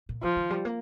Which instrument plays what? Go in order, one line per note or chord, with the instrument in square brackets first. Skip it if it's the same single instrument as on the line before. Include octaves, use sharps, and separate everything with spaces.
[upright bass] A#2
[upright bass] D#3 [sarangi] F3
[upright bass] D#3
G3
A#3